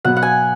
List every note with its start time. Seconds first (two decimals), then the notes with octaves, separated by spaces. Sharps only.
0.05 B2 F#3 B3 F#5
0.16 F#5
0.23 G#5